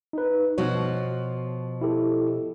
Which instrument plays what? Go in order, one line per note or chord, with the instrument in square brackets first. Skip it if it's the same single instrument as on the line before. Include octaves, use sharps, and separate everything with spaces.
[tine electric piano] D#4 B4
[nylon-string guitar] B2 F3 F#4 [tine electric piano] C#5
[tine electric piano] E4 G4 A4